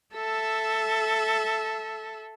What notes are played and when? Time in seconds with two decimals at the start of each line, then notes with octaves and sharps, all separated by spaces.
0.14 A4 E5